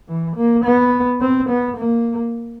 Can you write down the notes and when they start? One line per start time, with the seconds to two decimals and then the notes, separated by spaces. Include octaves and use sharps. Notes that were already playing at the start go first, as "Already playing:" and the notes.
0.08 E3
0.36 A#3
0.64 B3
1.21 C4
1.49 B3
1.77 A#3